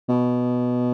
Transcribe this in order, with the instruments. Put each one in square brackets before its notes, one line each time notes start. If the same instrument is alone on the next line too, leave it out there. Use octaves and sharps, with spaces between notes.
[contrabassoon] B2